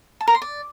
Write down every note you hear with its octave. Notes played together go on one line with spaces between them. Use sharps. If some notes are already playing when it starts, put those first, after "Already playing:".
A5
A#4
C6
D5